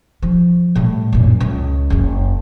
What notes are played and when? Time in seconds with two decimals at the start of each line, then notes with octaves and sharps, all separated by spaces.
0.22 F3
0.75 A2 G3
1.13 F#2 A#2
1.40 C#2
1.90 F#1 F#2